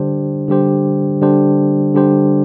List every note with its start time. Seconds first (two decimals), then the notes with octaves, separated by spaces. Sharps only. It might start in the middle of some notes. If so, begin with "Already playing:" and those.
Already playing: D3 G3 D4 G4 C5
0.48 D3 G3 D4 G4 C5
1.21 D3 G3 D4 G4 C5
1.94 D3 G3 D4 G4 C5